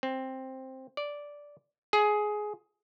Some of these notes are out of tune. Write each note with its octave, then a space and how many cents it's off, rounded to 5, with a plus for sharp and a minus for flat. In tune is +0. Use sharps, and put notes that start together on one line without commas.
C4 +5
D5 -5
G#4 +15